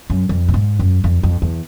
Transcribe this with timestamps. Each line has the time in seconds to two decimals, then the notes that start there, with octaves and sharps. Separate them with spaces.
0.10 F#2
0.29 F2
0.48 A2
0.54 G#2
0.79 F#2
1.04 F2
1.23 F2
1.42 E2